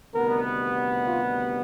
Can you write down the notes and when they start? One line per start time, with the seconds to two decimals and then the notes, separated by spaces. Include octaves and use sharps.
0.14 D2 C3 D#3 G3 B3 A#4
1.07 F4